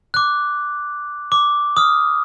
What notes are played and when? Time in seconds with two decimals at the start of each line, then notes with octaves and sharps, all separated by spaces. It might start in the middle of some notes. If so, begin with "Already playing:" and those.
0.14 D6 F#6
1.32 D6
1.77 D#6 F6